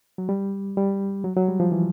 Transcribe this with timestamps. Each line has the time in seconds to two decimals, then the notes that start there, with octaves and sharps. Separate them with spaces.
0.18 F#3
0.29 G3
0.77 G3
1.24 F#3
1.37 F#3
1.48 G3
1.60 F3
1.72 E3